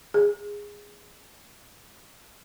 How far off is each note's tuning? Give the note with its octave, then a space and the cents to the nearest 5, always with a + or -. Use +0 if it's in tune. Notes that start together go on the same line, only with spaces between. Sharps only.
G#4 -10